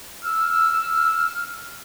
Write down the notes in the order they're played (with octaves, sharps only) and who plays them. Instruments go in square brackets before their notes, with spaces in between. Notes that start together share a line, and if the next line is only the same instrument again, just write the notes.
[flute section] E6 F6